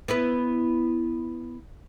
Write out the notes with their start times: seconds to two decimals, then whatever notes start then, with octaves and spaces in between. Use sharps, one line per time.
0.08 B3 E4 B4